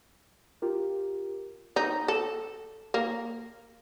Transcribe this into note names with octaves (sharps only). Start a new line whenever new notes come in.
F4 G4 A#4
D#4
A4
A#3